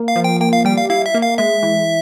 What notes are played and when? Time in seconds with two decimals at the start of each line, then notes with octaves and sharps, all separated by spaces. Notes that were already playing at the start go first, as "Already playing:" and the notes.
Already playing: A#3
0.08 F5
0.16 F3
0.24 G5
0.40 A#3 G5
0.53 F5
0.65 G3 G5
0.77 F5
0.90 E4 F5
1.06 E5
1.14 A#3
1.22 F5
1.38 G#3 E5
1.63 E3